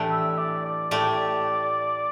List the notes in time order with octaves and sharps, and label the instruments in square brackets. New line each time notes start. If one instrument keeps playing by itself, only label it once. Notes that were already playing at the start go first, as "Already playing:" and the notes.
Already playing: [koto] A2 E3 A3 D4 G4
[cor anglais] E5
D5
D5
[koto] A2 A3 G4 [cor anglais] D5